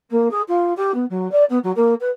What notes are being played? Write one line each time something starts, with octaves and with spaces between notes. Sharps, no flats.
A#3
G#4
F4
G4
B3
F#3
D5
B3
F#3
A#3
B4